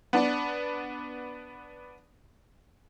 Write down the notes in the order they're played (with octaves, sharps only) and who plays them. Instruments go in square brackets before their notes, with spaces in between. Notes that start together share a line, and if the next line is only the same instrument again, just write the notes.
[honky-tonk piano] B3 D4